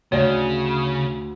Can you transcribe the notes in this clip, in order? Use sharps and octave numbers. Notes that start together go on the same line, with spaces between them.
D2 C#3 C#5 D5